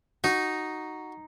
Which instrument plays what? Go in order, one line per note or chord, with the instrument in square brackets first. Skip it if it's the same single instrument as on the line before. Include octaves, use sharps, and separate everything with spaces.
[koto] D#4 [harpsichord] F#4